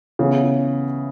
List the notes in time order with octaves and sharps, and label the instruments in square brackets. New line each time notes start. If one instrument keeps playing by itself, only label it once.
[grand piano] C#3 E3 B3